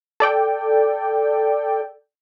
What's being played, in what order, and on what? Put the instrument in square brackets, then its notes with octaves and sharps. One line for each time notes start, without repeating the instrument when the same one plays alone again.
[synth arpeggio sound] A4 D5 G5